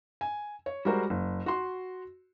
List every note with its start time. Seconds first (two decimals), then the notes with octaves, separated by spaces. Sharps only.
0.21 G#5
0.66 C#5
0.85 G3 G#3 F#4 A#4 C5
1.10 F#1
1.46 F#4 C6